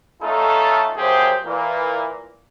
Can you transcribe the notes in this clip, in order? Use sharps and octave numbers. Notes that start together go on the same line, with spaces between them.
A3 C#4 D#4 F4 A4
F#2 C3 F3 G4 G#4 C5
A#2 E3 A#3